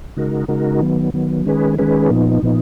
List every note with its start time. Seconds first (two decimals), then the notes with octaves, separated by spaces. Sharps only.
0.17 C#3 G#3 D#4 F#4 A#4
0.48 C#3 G#3 D#4 F#4 A#4
0.81 D#3 F#3 B3
1.14 D#3 F#3 B3
1.46 D#3 G#3 C#4 G#4 B4
1.78 D#3 G#3 C#4 G#4 B4
2.10 A#2 F3 B3 D#4
2.42 A#2 F3 B3 D#4